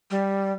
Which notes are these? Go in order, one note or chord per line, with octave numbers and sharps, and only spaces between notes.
G3